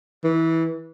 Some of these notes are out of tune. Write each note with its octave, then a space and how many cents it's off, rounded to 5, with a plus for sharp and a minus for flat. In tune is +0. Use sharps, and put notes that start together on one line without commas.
E3 -20